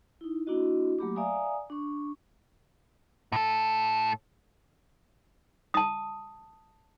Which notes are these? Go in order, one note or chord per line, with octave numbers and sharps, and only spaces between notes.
D#4 E4
A#3 D4 E4 F#4 D#5
F#3 A3 A#3 G4 B5 D6
D5 E5 F5 G#5 A#5 D#6
D4 C#6
A2 A4
A5 D#6